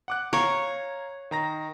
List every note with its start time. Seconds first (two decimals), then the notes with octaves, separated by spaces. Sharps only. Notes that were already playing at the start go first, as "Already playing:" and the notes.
0.08 F#5 D6 F#6
0.33 C#5 F5 A#5 G#6
1.31 D#3 A#5 A#6